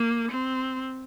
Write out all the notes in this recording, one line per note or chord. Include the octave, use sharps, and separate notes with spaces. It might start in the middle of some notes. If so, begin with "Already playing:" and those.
Already playing: A#3
C4